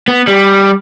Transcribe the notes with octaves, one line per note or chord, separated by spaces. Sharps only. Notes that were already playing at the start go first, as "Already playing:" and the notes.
B3
G3